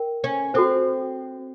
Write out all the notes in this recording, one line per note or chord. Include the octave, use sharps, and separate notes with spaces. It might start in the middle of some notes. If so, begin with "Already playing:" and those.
Already playing: A#4 G5
C#4
C4 F#4 A4 C5